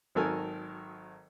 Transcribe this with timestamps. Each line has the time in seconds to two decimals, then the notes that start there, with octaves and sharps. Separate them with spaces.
0.15 G#1 D#3 F#3 A4 A#4 G#5